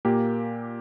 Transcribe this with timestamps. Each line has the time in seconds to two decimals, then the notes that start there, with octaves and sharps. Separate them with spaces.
0.05 A#2 A#3 G4